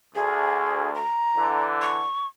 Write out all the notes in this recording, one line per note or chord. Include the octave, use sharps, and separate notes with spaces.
D2 G#4
A#5
D3 E3
C#6